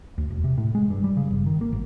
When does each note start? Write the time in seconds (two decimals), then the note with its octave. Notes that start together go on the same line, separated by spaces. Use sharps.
0.18 D2
0.30 E1
0.44 C3
0.58 A2
0.75 G#3
0.90 G2
1.04 G3
1.17 C#3
1.31 G1
1.46 D#3
1.61 A#3
1.73 G#1